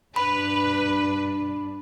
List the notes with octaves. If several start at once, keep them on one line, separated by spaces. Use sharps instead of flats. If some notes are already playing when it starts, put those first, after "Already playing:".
G2 D4 B4 B5